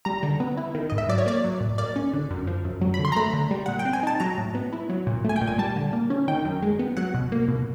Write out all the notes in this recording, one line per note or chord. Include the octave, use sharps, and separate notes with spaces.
G3 A#5
D3
B3
E4
D#3
G#2 D#5
E5
F#3 D5
C#5
A#3 D5
F#3
A2
A#3 D5
C#4
D3
F#2
F3
F#2
F#3
B5
D3
C6
A#5
A3 B5
D3
G3
A#2 F#5
G5
C4
G#5
D#4 A5
F#3 A#5
A2
B3
E4
F#3
A#2
A3 G#5
G5
A#2
G#5
G3 A5
D3
A#3
C#4
D#3 G5
F#2
G#3
B3
F#3 F#5
B2
A#3
B2